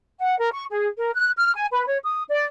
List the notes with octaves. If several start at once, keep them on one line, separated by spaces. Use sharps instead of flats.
F#5
A#4
C#6
G#4
A#4
F#6
F6
G#5
B4
C#5
D#6
D5